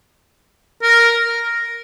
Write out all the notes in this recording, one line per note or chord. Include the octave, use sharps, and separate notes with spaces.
A#4